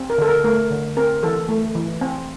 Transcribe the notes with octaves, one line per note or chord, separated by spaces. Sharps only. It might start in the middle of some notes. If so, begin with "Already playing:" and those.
Already playing: C4
A#4
D3 A4
A#4
A3 A#4
D3
C4 A#4
E3 A4
A3
E3
C4